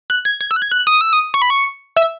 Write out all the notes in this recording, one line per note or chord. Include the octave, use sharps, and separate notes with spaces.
F#6
G#6
G#6
E6
F#6
G#6
F#6
D#6
E6
D#6
C#6
B5
C#6
E5